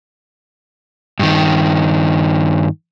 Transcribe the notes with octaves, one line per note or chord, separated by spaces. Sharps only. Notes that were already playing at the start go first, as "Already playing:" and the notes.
G2 D#3